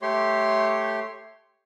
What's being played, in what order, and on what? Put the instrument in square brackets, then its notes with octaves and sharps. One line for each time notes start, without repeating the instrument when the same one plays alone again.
[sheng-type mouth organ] A3 G4 C#5 C6